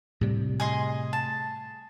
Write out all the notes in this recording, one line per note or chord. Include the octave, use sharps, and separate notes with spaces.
A2 C3 G3
G#4 D#5 C6
A5